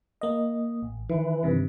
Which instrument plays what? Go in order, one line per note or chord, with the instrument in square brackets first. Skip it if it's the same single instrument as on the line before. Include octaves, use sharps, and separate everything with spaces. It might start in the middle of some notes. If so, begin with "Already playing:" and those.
[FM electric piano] A#3 D#5
A1
[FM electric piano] D#3 [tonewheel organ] E3
[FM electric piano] G2 C3 D#3